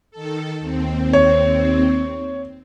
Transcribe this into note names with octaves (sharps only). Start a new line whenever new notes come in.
D#3 A4
D#2 C4
C#5